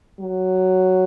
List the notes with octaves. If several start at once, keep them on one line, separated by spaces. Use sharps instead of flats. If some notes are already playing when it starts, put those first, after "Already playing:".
F#3